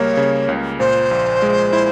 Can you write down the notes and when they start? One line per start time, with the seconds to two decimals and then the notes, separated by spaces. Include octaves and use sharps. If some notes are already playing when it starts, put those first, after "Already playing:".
Already playing: C#2 C#3 G3 A#3 C#5
0.17 C#3
0.48 C#2
0.79 A#2 C5
1.11 A#1
1.42 G#3
1.73 E4